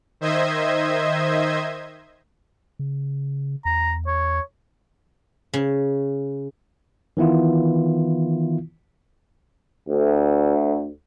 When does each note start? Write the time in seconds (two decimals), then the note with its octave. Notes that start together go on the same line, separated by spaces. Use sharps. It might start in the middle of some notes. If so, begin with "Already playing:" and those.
0.21 D#3 C5 D#5 E5 G#6
2.79 C#3
3.65 E2 A#5
4.07 C#5
5.54 C#3
7.17 D#3 E3 B3 E4 F4
9.89 D2